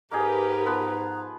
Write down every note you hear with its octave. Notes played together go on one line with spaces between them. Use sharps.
G#2 A#3 D#4 G4 G#4 A#4 B4 A#5
F3 B3